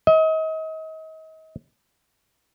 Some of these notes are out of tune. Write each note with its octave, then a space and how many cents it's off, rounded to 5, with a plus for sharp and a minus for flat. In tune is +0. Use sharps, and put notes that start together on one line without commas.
D#5 +35